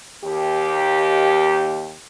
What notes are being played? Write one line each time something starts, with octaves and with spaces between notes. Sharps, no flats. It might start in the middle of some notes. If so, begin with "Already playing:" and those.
D#2 G4